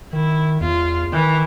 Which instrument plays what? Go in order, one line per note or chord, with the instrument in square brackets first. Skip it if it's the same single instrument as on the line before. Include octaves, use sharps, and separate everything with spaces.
[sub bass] D#3 [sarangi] E4
[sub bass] E2 [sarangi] F4
[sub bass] D#3 [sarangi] E3